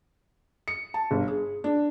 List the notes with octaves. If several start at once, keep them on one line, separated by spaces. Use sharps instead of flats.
C#7
A5
G1
G#4
D4